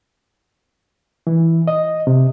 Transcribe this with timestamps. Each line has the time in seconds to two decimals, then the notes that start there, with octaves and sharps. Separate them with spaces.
1.27 E3
1.68 D#5
2.07 C3